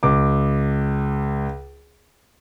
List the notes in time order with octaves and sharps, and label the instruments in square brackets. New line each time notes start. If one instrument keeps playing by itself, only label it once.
[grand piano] C#2 D6